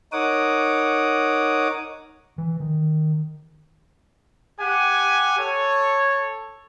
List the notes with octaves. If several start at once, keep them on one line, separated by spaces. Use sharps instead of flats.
D#4 A#4 C#5 F#5 D6 D#6
E3
D#3
G4 F#5 G#5
A4 C#5